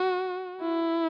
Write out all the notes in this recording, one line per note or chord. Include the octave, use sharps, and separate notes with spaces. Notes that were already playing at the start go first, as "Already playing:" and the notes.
Already playing: F#4
E4